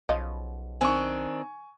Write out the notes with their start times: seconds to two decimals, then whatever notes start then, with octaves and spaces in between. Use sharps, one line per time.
0.09 B1 C#3 F3 D#5
0.81 D#3 C4 D4 G#5 C#6